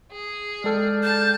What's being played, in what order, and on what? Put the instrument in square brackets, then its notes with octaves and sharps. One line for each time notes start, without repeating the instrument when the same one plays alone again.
[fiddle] G#4
[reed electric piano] G#3 A4 [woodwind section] D5 G5 F6
[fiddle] A5 [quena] G6